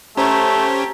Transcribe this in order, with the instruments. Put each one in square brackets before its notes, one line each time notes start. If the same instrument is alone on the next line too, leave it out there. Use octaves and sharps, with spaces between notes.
[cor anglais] A3 [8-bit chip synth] C#4 C5 C#5 [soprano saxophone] G4 [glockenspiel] A#5